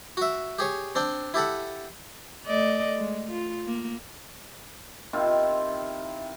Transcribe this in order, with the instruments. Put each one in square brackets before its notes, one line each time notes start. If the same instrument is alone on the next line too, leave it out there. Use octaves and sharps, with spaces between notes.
[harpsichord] F#4 E5
G4 G#4 C#5
C4 D4 G5
E4 G4 A4 F#5
[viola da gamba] A3 D5 D#5
G#3
F4
A#3
[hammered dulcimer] C3 D#3 E4 F4